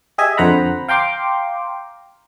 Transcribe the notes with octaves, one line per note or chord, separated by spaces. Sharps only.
G4 G#4 D#5 E5 G#5
F2 D3 C5 F#5 A#5 B5
F5 G5 A#5 C6 D6